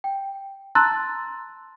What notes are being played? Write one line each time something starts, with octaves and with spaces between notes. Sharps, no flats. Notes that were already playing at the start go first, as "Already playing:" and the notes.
G5
A5 A#5 C6 E6 F#6 A6